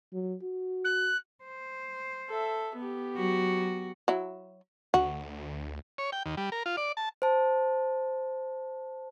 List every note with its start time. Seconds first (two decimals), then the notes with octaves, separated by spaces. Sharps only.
0.13 F#3
0.43 F#4
0.84 F#6
1.44 C5
2.29 A4 E5
2.76 B3 G4
3.16 F#3 F#4
4.08 F#3 E4
4.94 D2 F#4
5.98 C#5
6.12 G5
6.26 D#2
6.37 G3
6.52 A#4
6.66 F4
6.77 D5
6.97 A5
7.22 C5 A5